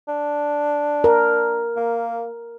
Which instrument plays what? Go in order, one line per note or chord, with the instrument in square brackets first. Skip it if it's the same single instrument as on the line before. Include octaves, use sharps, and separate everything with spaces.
[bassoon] D4
[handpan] A#4
[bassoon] A#3